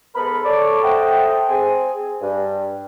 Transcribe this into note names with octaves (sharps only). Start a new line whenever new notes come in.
G#2 B3 A4 A#4 B5
A4 C#5 D5
A4 C5 D#5 E5 F#5 G5
C4 G#4 G#5
G2